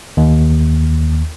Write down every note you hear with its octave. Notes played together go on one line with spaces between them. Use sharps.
D#2